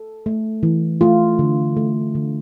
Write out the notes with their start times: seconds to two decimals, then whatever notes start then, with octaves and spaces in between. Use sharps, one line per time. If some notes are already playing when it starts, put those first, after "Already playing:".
Already playing: A4
0.26 A3
0.63 E3
1.01 A3 F4
1.39 D3
1.77 A3
2.15 D3